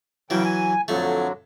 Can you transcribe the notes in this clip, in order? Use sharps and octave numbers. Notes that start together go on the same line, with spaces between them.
C#3 E3 F#3 G5
G#5
F2 D3 F#3 A3